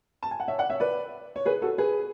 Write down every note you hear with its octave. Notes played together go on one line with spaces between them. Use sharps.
A5
G#5
F#5
C#5 E5
D5 F#5
C#5 E5
B4 D5
C#5
G#4 B4
F#4 A4
G#4 B4